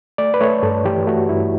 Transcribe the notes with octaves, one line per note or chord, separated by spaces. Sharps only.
A3 D5
B4
A3 C#5
G2 A4
E3 G4
A3 F#4
G2 E4